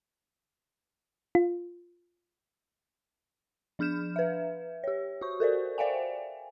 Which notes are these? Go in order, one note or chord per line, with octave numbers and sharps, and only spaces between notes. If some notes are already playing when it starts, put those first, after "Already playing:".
F4
F3 D4 F6 G6 E7
B4 E5
G4 C#5
F#4 C#6
A4 A#4 C5 D5
C5 D5 E5 F5 G5 G#5